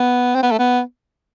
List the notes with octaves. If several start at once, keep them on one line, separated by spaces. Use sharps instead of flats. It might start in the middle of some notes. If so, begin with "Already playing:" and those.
Already playing: B3
C4
B3
A3
B3